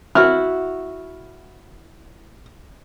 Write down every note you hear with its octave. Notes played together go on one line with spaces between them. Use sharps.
E4 F#4 F6